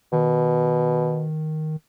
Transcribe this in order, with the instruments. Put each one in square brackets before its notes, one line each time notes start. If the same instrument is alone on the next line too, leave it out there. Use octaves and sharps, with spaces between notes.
[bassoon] B2 [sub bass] D#3